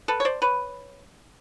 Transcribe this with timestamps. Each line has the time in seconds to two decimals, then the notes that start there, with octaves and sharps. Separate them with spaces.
0.08 A4 B4
0.20 C#5
0.25 C5 D5
0.42 B4 C#5